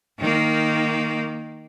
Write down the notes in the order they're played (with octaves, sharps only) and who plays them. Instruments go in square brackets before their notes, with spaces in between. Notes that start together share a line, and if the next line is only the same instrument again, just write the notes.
[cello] D#3 A#3